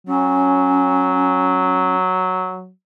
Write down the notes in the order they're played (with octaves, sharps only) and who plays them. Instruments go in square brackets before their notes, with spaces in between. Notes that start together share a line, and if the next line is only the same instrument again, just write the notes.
[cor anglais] F#3 [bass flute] C#4